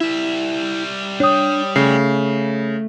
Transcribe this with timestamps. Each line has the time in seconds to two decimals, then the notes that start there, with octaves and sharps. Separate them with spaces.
0.01 G3 E4 E5
1.20 D4 C#5 G5 D#6
1.76 C#3 A3 C7